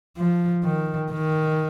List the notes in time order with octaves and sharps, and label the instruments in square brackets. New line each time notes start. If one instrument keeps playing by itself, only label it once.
[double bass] F3
D#3
D#3